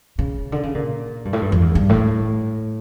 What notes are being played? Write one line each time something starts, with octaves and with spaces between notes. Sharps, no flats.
C#3
D3
C#3
A#2
G2
A2
G2
F2
E2
G2
A2